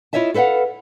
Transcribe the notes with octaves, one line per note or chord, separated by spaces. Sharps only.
E4 F4 C#5 D#5 E5 A5
A4 B4 C5 F5 F#5